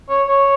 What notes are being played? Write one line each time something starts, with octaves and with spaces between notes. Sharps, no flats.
C#5
C#5